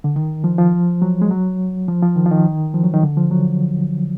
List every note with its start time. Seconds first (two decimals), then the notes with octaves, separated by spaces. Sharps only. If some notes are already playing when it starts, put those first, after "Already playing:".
0.04 D3
0.16 D#3
0.44 F3
0.58 F3
1.02 F#3
1.22 G#3
1.31 F#3
1.88 F3
2.02 F3
2.16 D#3
2.26 F3
2.31 D#3
2.74 F3
2.84 F#3
2.94 D#3
3.03 D3
3.17 F3
3.31 F#3